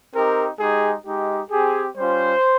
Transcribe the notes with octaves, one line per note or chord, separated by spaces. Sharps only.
C4 D#4 G4 A#4
G#3 D#4 G4 G#4
G#3 D#4 G4
C4 G4 G#4
G3 C#4 F4 C5